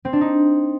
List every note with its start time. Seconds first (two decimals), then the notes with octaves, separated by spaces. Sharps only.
0.05 C4
0.13 D4
0.21 D#4